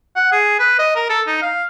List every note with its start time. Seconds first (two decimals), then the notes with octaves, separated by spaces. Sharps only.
0.16 F#5
0.32 G#4
0.60 B4
0.79 D#5
0.96 A#4
1.10 A4
1.27 D#4
1.42 F5